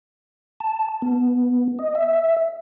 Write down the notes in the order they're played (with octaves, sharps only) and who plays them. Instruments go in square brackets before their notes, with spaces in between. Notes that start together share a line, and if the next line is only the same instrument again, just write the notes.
[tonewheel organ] A5
B3
D#5
E5